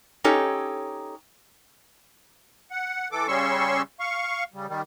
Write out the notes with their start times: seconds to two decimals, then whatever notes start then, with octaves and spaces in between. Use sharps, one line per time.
0.24 C#4 D#4 G4 A4 C#5
2.71 F#5
3.12 E3 A4 D6
3.28 C#3 G3 C#4 C6 C#6 E6
4.00 F5 C#6
4.54 C#3 G3
4.69 D#3 G3